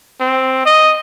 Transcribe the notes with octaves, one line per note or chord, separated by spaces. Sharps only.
C4
D#5